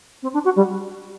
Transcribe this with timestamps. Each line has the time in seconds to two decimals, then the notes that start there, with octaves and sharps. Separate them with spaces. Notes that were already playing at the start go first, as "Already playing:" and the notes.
0.22 C4
0.33 D4
0.44 F#4
0.56 G3